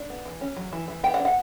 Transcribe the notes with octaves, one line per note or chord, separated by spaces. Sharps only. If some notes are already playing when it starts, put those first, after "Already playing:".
Already playing: D4
B3
E3
C#4
F#3
E3
E3
B3 G5
F#5
D4
F#5